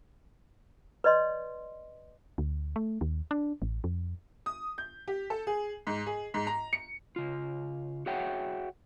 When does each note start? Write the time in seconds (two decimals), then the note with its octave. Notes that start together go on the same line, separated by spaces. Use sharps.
1.04 B4 D5 D#5 C6
2.38 D2
2.76 A3
3.01 D#2
3.31 D4
3.62 A1
3.84 F2
4.46 D#6
4.78 G6
5.08 G4
5.30 A4
5.47 G#4
5.87 G#2
6.06 G#4
6.34 G#2
6.47 A#5
6.73 C#7
7.16 C#3 F4
8.06 F#4 G#4 C#5 E5 F#5 G5